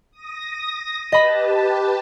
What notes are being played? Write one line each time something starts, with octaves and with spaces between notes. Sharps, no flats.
D#6 A#6
G4 B4 D#5 A5 B5